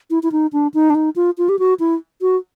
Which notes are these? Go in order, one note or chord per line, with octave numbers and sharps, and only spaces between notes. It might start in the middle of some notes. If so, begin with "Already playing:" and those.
E4
E4
D#4
D4
D#4
D4
D#4
F4
F4
G4
F#4
E4
F#4